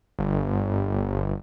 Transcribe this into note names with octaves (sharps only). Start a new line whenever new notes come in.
G1